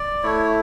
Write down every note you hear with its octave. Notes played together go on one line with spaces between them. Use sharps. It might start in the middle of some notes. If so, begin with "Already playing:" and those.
Already playing: D5
A3 E4 C#5